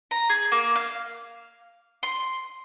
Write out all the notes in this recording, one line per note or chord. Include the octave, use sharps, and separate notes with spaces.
A#5
G#4
A#3
F5
C6